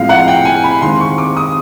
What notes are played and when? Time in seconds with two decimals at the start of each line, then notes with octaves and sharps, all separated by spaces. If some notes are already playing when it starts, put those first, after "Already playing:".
Already playing: A2 F3 G#3 C4 F5
0.09 F#5
0.28 G5
0.45 G#5
0.64 B5
0.82 D#3 G#3 C4 C6
1.00 C#6
1.18 D6
1.37 D#6